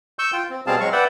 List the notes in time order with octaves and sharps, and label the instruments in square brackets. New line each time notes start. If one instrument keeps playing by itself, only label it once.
[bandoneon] C#6 E6 G6
F4 G5
C4
B2 G3 C4 G#4 F5 A5
F#3 G#3 C4 F5 C#6
B4 D5 E5 F#5 G5